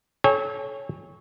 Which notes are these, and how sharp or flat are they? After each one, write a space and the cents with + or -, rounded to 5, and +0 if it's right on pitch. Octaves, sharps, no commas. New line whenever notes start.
A4 -35 C#5 +0 G#5 -45